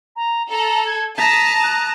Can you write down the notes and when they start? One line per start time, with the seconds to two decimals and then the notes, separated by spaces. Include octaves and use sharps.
0.16 A#5
0.50 A4 A#5
0.86 G#6
1.18 A5 A#5 D#6 B6
1.63 F#6